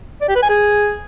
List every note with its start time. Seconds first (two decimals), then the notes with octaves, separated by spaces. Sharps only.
0.21 D5
0.28 G4
0.35 B4
0.42 G#5
0.49 G#4